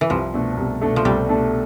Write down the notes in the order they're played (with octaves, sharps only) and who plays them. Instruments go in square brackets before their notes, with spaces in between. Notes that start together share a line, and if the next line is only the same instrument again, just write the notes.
[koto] E3
[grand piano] C2 [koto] F3
[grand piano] B2 A3 D4 A4
C2
B2 A3 D4 A4
[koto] F3
[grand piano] C2 [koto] G3
[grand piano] B2 A3 D4 A4